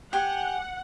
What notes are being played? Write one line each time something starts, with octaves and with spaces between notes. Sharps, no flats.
G4 F#5 G#5